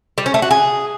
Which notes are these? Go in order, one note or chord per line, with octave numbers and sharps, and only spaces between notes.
G3
C#4
A3
F#4
G#4